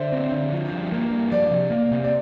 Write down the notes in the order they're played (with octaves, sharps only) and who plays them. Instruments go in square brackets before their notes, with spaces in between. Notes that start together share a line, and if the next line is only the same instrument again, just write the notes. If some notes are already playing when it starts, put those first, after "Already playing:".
Already playing: [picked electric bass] D3 [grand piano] C5 D5 E5
[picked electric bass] C4
D3
F3
G2
A#3
G2
[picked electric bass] F3 [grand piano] D5
[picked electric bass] C3
A#3
C3
[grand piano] D5